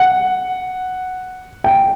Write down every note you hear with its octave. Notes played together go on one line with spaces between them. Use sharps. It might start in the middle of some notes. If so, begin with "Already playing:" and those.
Already playing: F#5
G5